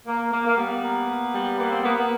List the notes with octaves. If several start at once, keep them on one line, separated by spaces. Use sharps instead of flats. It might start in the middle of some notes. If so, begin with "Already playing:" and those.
A#3
A#3
A#3
G3 B3
A#3
A#3
G3
A#3 B3
C4
A#3 B3
B3